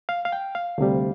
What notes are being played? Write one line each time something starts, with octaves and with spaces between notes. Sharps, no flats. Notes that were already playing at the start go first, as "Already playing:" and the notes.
F5
F5
G5
F5
D2 C3 G3